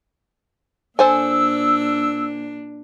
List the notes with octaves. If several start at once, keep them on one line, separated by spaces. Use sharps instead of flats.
A#2 D4 A4 C5 G#5 E6